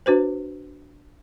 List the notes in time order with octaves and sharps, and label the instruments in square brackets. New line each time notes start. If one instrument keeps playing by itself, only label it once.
[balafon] D4 F#4 B4 C5